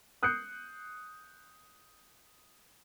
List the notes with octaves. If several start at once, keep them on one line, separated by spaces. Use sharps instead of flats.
D#6 F#6 G6 C7 C#7